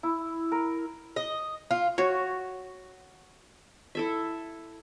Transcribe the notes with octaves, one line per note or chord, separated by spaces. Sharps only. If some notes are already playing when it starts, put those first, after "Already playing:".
E4
A#4
D#5
F4
F#4 C#5
E4 A4 E5